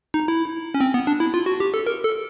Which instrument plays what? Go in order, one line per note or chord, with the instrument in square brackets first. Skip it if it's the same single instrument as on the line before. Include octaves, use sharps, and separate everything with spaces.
[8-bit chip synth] D#4
E4
C#4
C4
B3
D4
E4
F4
F#4
G4
A4
A#4
A4